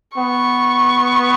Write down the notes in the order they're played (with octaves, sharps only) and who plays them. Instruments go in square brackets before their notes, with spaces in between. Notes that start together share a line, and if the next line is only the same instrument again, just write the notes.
[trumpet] B3 [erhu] C#6